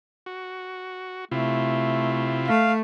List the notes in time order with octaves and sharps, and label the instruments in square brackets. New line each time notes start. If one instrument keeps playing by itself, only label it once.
[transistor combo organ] F#4
[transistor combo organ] C3 E4 F4 [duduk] A3
[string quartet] A3 [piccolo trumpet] F5